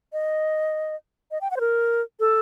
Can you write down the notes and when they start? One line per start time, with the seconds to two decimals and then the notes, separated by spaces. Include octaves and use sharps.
0.13 D#5
1.31 D#5
1.41 G5
1.51 F#5
1.57 C5
1.60 A#4
2.20 A4